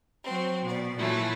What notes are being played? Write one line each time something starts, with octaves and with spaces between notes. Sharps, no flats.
F#3 C4
B2 D5
A#2 E3 F#3 A3 E4